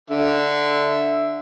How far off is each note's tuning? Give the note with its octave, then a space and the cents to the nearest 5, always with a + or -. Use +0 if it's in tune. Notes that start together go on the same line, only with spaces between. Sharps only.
D3 +0 E5 +0